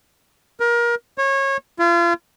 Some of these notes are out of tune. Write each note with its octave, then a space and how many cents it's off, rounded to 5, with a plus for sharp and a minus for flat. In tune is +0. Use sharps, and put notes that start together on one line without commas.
A#4 +25
C#5 -25
F4 -35